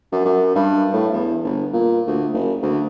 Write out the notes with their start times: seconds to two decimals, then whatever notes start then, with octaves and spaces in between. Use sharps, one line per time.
0.12 F#2
0.25 F#2
0.55 G2
0.93 A2
1.13 E2
1.44 G1
1.73 A#2
2.07 D2
2.33 F#1
2.63 D2